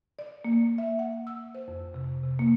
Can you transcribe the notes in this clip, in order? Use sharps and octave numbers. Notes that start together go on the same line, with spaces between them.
D5
A#3
E5
F#5
E6
C5
F2
C3
C3
A#3